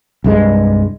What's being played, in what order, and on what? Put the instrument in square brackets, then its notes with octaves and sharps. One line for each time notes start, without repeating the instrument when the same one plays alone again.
[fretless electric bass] C2 G2 G#3